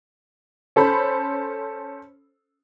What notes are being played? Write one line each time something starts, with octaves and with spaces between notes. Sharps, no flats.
C#4 A4 C5 B5